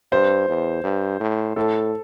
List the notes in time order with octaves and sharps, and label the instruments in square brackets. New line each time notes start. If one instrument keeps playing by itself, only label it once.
[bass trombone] G2 [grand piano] C5
[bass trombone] E2
G2
A2
[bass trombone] A2 [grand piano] A4